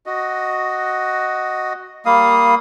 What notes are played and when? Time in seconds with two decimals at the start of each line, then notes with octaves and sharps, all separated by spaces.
0.06 F#4 D#5
2.06 G3 A#3 F5 D#6